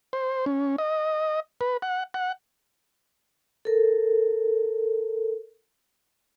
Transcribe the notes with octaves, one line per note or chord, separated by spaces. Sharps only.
C5
C#4
D#5
B4
F#5
F#5
A4 A#4